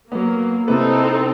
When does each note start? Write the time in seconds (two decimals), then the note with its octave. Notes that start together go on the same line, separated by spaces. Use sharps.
0.12 F#3 A#3 B3
0.68 C3 C4 D#4 E4 A4 B4